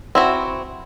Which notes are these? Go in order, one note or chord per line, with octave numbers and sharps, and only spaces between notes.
C4 E4 F#4